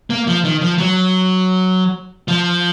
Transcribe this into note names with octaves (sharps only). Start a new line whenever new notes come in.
A#3
F3
D#3
F3
F#3
F3